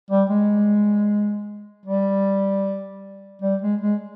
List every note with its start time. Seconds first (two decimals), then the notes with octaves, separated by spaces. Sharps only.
0.11 G3
0.30 G#3
1.86 G3
3.42 G3
3.62 G#3
3.81 G#3